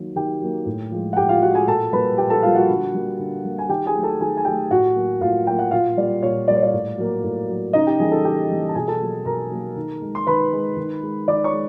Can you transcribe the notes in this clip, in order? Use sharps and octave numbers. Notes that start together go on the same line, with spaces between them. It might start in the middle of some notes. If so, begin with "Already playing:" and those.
Already playing: D#3 F#3 A#3
D#3 G4 G5
F#3 A#3
A2
F3 G#3
F#5
A2 G4 G5
F4 F5
F3 G#3 F#4 F#5
G#4 G#5
A#2 A4 A5
G3 A#3 B4 B5
A#2 G4 G5
A4 A5
G3 A#3 F4 F5
F#4 F#5
D3
G3 A#3
D3
G3 A#3
G#5
D#3 G4 G5
G#4 G#5
F#3 A3
A4 A5
D#3 G#4 G#5
G#5
F#3 A3 G4 G5
A2 F#4 F#5
F#3 A#3
A2 F4 F5
F#3 A#3 G5
F#5
A#2 F4 F5
G3 A#3 D5
A#2 C#5
G3 A#3 D5
C#5
D5
A2
F#3 A#3
A2
F#3 A#3
C#3 D#4 D#5
G4 G5
E3 G3 A#3 G#4 G#5
A4 A5
C#3 G4 G5
E3 G3 A#3
A5
B2 G#4 G#5
A4 A5
F#3 A#3
B2 A#4 A#5
F#3 A#3
D#3
G#3
C6
D#3 B4 B5
G#3
D#3
G#3
D#3 D5 D6
C#5 C#6
G#3